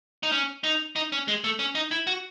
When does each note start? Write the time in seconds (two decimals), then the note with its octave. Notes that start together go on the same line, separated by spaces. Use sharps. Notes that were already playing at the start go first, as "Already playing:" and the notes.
0.23 D#4
0.32 C#4
0.64 D#4
0.96 D#4
1.12 C#4
1.28 G#3
1.44 A3
1.59 C#4
1.75 D#4
1.91 E4
2.07 F#4